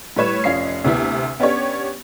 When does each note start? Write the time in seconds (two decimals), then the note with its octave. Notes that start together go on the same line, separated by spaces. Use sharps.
0.17 A2 G3 B4 C#5 G#6 E7
0.44 F1 C#4 F4 D#5 C7
0.84 D2 C3 B3 E4
1.40 B3 C#4 D4 G4 C#5